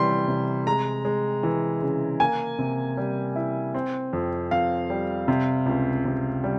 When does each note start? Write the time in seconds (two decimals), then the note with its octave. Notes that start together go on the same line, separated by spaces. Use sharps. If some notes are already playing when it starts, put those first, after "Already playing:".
Already playing: C3 E3 G3 C6
0.28 C3
0.67 G#3 A#5
1.05 G#3
1.43 E3
1.82 C#3
2.20 A#3 G#5
2.59 C3
2.97 G3
3.36 E4
3.74 C4
4.13 F2
4.51 F2 F5
4.90 G3
5.28 C3
5.66 C#2
6.05 C3
6.44 G3